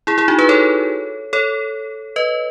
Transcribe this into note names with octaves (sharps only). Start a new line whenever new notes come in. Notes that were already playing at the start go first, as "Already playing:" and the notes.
E4 G#4
E4 G#4
D#4 F#4
G#4 B4
A4 C#5
A4 C#5
B4 D#5